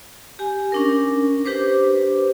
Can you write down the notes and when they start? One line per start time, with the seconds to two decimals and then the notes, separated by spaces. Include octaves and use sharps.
0.39 G4 G#5
0.72 C#4 D4 A#4
1.45 D4 G4 B4 C5 D6